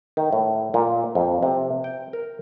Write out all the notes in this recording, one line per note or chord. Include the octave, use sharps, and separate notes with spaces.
D#3
A2
A#2
F2
C3
G5
A#4